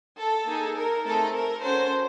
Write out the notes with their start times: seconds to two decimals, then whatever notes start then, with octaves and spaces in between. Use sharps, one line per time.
0.18 A4
0.46 A#3 D#4 G#4
0.75 A#4
1.04 A3 C4 D#4 G#4 A4
1.33 A#4
1.62 C#4 F#4 A4 C5